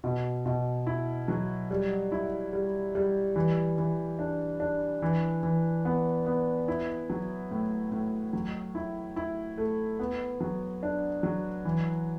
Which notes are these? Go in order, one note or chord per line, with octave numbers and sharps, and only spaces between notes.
B2
B2
E4
F#3
G3
E4
G3
G3
E3
E3
D4
D4
E3
E3
B3
B3
E4
F#3
A2
A2
F#3
E4
E4
A3
B3
F#3
D4
F#3
E3